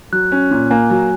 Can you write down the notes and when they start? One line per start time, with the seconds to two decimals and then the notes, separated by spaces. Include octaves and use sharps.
0.12 F#3 F#6
0.32 C#4
0.51 A#2
0.70 A#3 G#5
0.90 F#3